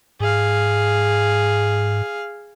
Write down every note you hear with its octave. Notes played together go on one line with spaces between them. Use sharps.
G#2 G#4 F5